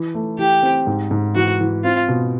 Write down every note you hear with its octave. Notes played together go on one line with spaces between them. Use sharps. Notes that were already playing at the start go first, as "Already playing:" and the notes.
Already playing: E3
A3
E3 G4
C4
G#2
G#2
E3 F#4
E3
C4 F4
B2